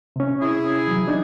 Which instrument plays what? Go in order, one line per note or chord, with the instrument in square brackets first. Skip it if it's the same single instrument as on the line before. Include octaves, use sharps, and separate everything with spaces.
[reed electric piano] C3 C#4
[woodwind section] E4 G#4
[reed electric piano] E3 F#3
D4 D#4 G#6